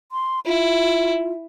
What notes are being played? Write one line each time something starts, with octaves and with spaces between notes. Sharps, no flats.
C6
E4 F4